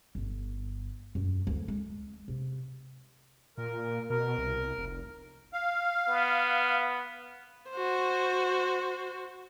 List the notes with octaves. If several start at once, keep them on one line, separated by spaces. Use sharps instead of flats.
G1
F#2
D2
G#3
C3
A#2 A#4
B2 A#4
C2
F1
F5
B3
F#4 C5